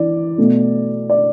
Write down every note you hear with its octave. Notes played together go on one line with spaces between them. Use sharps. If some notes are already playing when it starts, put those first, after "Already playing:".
Already playing: E3 D5
B2 A3
D5